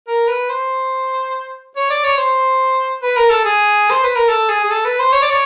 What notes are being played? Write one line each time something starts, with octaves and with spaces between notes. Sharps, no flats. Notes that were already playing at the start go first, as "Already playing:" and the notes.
A#4
B4
C5
C#5
D5
C#5
C5
B4
A#4
A4
G#4
C5
B4
A#4
A4
G#4
G#4
A4
B4
C5
C#5
D5
C#5